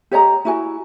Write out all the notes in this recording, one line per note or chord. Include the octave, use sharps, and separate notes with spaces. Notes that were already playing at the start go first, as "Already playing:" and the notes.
G4 C#5 D#5 A#5
E4 F#4 G#5